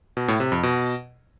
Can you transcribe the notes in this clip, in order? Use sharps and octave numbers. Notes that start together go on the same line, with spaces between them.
B2
A2
C3
F2
B2